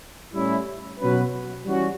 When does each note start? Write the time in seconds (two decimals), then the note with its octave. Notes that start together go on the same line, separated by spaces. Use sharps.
0.32 A2 G3 C#4 E4
0.99 B2 F#3 C#4 F#4 B4
1.64 E3 G3 C#4 F#4